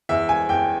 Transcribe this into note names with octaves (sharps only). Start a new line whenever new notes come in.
E2 E5
G#5
E2 G5